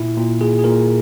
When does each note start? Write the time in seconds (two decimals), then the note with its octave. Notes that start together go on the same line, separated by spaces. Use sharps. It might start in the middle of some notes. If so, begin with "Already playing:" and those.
Already playing: A#2 E4
0.17 A#2
0.41 A#2 G#4
0.59 G#4
0.64 A#2 A#4